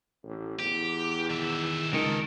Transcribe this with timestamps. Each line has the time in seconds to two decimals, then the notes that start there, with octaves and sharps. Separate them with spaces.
0.23 A1
0.59 E2 G4
1.30 D#3 E5
1.93 C#2 D#3 A4 A#4